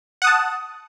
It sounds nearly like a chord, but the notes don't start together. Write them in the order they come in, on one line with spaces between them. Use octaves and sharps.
F#5 D#6 A5